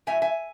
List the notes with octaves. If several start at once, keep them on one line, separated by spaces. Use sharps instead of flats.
A2 F#3 A3 E5 G#5
E5 G#5